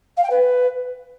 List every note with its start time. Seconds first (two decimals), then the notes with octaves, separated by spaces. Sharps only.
0.16 F5
0.23 G5
0.30 B4